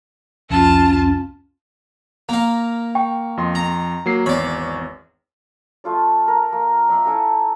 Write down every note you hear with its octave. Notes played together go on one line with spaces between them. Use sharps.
C2 F2 C#4 F4 A5 A6
A#3 F5 A#5
G5 C#6
F2 D#5 C6
A#5
F#3 A#3 C7
G#1 E2 C#5 D5 B5
A3 F4 D5
A#4
A#3
D5 E5 F5 B5
E4 A4 G#5 A#5